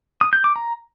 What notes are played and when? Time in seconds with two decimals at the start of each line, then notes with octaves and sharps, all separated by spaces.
0.21 D#6
0.33 G6
0.44 D6
0.56 A#5